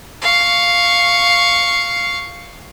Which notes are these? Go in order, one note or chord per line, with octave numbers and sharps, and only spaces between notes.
F5 C#6